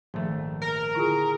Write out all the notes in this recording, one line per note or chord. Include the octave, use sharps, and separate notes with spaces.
A#1 G#2 D#3 F3 A3
A#4
D3 E4 F4 G#4 C#6